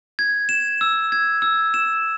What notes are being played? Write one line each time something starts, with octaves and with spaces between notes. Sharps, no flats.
G#6
E7
E6
G#6
E6
E7